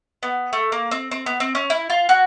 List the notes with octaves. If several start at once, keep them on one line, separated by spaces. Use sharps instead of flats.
B3
A3
A#3
C4
C4
B3
C4
C#4
E4
F4
F#4